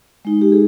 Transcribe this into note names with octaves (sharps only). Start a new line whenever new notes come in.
G#3 D#4
G4
G#4